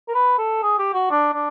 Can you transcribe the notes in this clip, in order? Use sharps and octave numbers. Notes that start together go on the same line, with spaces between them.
A#4
B4
A4
G#4
G4
F#4
D4
D4